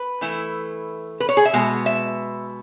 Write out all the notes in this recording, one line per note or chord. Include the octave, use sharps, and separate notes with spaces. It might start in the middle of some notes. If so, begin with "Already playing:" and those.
Already playing: B4
E3 A3 E4
B4
C#5
G#4
E5
B2 G#3 B3
E5